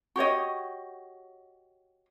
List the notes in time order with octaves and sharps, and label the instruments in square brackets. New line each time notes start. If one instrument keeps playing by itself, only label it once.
[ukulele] F#4 G4 C#5 D#5